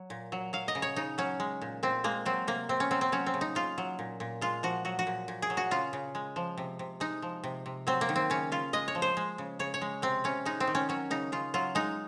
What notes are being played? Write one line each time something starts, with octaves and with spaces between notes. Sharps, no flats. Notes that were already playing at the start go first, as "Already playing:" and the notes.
Already playing: F#3
A#2
F#3
F#3 F5
D#5
C#3
C#5
C#3 D#4
F#3 C#4
G#3
A#2
A#2 C4
G#3 A#3
F#3 C4
C3 A#3
C3 C4
C#4
F#3 C4
C4
F#3 C#4
C4
C#3
D#4
C#3 F4
F#3
A#2
A#2
G#3 F4
F3 F#4
F#3 F#4
F#4
A#2
A#2
G#4
F#3
F#4
C#3 F4
C#3
G#3
F3
C3
C3
G#3 D#4
F3
C3
C3
F#3 C4
A#3
D#3
C4
C#3 C#4
C#3 F4
G#3 D#5
C#5
F3
C5
G#3
C#3
C#3 C#5
C#5
G#3
C3 C4
C3 C#4
G#3 D#4
C4
D#3
C#4
F#3 C#4
C#3 D#4
C#3 F4
F#3 F4
G#3 D#4